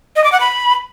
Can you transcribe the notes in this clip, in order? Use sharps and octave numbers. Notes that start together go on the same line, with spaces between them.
D#5
D6
F#5
B5